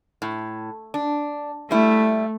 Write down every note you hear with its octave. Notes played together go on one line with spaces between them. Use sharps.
A2
D4
G3 A3 E4